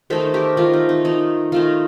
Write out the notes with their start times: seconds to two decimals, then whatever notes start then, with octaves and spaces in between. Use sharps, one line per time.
0.10 D#3 A3 D#4 A4 C5
0.34 G4 A#4
0.57 D#3 A3 D#4 F4
0.73 D#4
0.89 D#4
1.05 D#3 A3 D#4
1.52 D#3 A3 D#4 F4